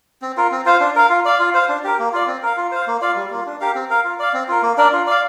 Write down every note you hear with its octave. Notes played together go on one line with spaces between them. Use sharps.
C4
F4 A#4
C4
F4 C5 F5
D4
A#4 F5
F4
D5 F5
F4
C5 F5
D4
G4 A#4
A#3
F4 D5
C4
A#4 F5
F4
C5 F5
A#3
F4 D5 F5
G3
A#3 F4
D4
G4 A#4 F5
C4
A#4 F5
F4
D5 F5
C4
F4 A#4
A#3
D4 A#4 D5
F4
D5 F5